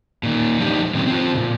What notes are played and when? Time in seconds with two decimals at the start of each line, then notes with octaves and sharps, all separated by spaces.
0.23 A#2 D#3
0.60 F3 G3 D4 D#4 G4
0.95 A#2 D3 D#3 F#3 C4 C#4
1.07 C4 F4
1.34 A#2 C#3